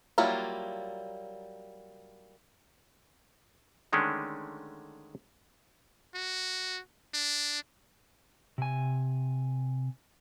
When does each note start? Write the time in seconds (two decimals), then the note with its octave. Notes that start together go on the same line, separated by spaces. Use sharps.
0.18 F#3 G3 A#3 E4 F4
3.93 D3 D#3 G#3 A3 C#4 D4
6.14 F#4
7.14 D4
8.58 C3 G#5